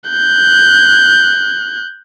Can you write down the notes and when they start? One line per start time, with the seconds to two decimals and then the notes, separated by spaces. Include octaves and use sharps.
0.10 F#6 G6